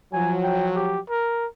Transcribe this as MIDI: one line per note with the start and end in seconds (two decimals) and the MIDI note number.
0.13 0.99 53
0.13 0.99 54
0.13 0.34 80
0.43 0.68 79
0.75 0.99 67
1.10 1.46 70